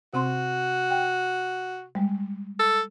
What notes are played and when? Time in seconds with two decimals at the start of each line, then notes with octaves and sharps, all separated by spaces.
0.14 C3 C4 F#4 C6
0.91 G5
1.95 G3 G#3
2.59 A4